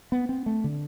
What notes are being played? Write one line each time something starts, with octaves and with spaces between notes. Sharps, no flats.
B3
C4
A3
D3